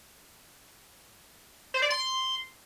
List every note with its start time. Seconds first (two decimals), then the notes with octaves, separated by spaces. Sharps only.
1.74 C5
1.82 D5
1.90 C6